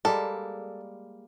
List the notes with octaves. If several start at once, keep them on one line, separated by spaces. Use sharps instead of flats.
G3 G#3 A#3 A4